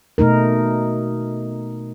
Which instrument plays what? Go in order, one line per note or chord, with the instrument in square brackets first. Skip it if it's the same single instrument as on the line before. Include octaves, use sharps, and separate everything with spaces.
[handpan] B2 A3 D#4 A#4